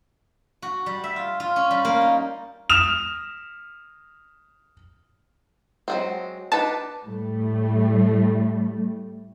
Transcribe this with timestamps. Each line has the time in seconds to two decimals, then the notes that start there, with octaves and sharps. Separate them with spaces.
0.62 F#4
0.86 G3
1.04 E5
1.16 F4
1.40 F4
1.56 C#4
1.71 G3
1.85 A#3
2.01 D#4
2.70 D#6 F6 E7 F7
5.88 F#3 G#3 C4
6.52 D4 D#4 B4 A5
7.05 A2 G3 A3